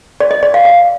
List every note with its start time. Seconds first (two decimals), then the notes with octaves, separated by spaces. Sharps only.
0.20 D5
0.31 D#5
0.43 D5
0.54 F5
0.65 F5